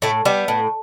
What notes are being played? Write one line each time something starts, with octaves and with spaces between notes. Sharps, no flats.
A2 A3
G3 B3
A2